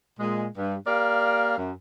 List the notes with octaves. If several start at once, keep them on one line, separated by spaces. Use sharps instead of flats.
A#2 G#3
G2
A#3 G4 A#4 D5 F5
F#2